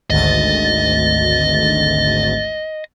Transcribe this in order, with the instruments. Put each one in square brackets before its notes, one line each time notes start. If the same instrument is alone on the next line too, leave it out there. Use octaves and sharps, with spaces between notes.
[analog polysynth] G#1 D2 A6 [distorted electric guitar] D#5